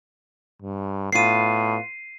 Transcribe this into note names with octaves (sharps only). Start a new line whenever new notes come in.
G2
A2 B3 F4 C7 D#7